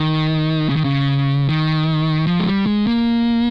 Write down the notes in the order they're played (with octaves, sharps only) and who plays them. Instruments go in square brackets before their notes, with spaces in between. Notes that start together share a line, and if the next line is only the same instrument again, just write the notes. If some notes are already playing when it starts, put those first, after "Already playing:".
Already playing: [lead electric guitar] D#3
C#3
D#3
C#3
D#3
F3
G#3
G3
G#3
A#3